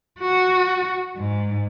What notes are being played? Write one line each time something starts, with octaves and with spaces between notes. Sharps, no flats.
F#4
G#2